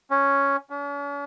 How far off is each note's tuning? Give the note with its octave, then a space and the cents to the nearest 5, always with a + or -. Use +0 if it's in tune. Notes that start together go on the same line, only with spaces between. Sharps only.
C#4 +0
C#4 +45